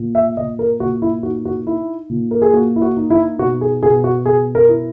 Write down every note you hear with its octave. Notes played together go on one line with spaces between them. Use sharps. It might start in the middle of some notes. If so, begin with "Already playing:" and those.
Already playing: A#2
E5
A#2 D#5
A#4
A#2 F#4
E4
D#4 F#4
F#4
D#4 E4
A#2
A#4
G#4
A#3 F#4
E4
F#4
D#4
E4
B2 F#4
G#4
B2 G#4
F#4
B2 G#4
A#4
E4